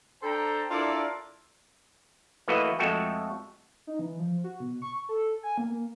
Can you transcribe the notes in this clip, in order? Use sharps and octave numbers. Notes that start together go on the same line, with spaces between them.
D4 A4 C5 G5 A5 A#5
D4 E4 F4 A4 A#4 D5
E3 A3 A#3 F#4 B4 D#5
F2 G#3 A3 F#4 A4 G5
D#4
E3
F3
F#4
B2
C#6
A4
G#5
A#3
A#3